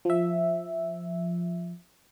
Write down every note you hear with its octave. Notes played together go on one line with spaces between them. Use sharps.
F3 E5